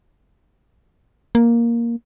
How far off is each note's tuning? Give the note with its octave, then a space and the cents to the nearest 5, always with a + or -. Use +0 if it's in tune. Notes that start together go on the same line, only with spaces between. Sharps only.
A#3 +5